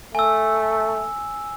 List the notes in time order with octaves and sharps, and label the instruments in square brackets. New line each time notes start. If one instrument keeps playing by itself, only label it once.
[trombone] A3 [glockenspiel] G#5 E6